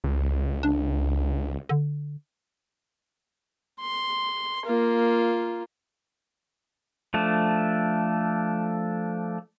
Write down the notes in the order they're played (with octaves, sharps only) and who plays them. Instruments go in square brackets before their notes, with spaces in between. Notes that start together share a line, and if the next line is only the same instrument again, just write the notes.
[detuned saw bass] C#2
[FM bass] D4
D3
[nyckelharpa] C6
A#3 F4
[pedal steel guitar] F3 A3 D4